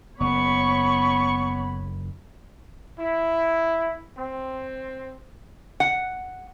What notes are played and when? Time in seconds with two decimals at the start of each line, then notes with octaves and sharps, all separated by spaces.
0.20 F#1 B3 C#5 B5 C#6
3.00 E4
4.18 C4
5.80 F#5